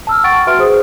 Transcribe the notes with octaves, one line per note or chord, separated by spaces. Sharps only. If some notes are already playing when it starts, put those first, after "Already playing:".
A5 E6 F6
F#5 G5 C#6 A6 D7
F#4 B4 E5 C6 F6 D7
G#4 C5 D#6